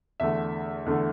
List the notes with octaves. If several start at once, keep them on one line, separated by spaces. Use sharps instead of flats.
E2 D3 A3 E5
E2 D3 A3